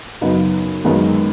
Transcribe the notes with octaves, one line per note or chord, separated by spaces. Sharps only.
F#2 C#3 F#3 B3 D#4
F#2 D#3 G#3 B3